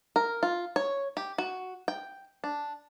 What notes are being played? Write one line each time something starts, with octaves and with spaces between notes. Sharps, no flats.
A#4
F4
C#5
G4
F#4
G5
D4